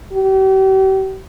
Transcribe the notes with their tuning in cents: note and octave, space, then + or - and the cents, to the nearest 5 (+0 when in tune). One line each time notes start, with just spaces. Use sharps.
G4 -40